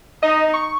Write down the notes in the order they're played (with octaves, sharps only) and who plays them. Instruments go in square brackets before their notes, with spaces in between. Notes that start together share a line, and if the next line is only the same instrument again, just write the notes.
[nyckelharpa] D#4 [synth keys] D#5
[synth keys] C#6